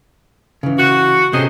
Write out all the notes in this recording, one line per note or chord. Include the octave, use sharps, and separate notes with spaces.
C#3 E3
F#4
C3 C#4 G#4 A4 C5 D#5